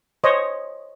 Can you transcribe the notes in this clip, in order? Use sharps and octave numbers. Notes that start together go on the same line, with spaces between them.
C5 C#5 D#5